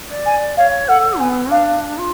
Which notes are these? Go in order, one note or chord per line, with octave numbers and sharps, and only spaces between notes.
D5
G#5
C#5 F5
A4 F#5
B3 G#5
D4 F5
F4